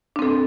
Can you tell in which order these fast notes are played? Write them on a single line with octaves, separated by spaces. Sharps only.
D4 C4 A4